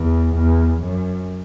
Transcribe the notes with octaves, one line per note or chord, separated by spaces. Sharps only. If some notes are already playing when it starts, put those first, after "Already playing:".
Already playing: E2
E2
F#2